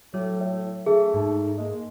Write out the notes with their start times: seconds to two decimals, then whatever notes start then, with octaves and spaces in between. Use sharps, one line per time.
0.14 A2 F#3 A4
0.40 A2
0.86 A3 D4 G#4
1.14 G#2 D#4
1.58 G#3 A#3